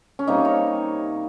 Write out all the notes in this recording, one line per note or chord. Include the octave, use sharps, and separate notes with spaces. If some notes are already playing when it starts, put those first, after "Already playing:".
C#4
C3 G3 A#3 D#4
C#5